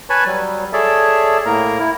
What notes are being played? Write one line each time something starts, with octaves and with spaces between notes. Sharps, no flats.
B4 C#5 G#5 A5 B5 C#6
F#3 G3
G#4 A4 C#5 D5 E5 A5
A2 A#3 A#4 A#5
E4